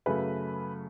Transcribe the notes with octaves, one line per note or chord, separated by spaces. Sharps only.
F#2 C#3 F#3 A3 B4